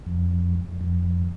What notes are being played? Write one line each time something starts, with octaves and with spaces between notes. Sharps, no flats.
F2
F2